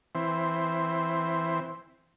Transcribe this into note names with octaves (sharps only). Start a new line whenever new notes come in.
E3 C4